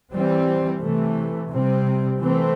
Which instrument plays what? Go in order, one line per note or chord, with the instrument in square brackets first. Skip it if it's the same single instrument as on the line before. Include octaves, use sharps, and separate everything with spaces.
[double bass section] E3 G3 C4
C3 E3 A3
C3 G3 C4
E3 A3 C4